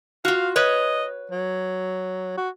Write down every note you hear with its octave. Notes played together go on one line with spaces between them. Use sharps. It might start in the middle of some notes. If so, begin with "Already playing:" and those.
F4 F#4 F5
B4 C#5 D#5
F#3
F#4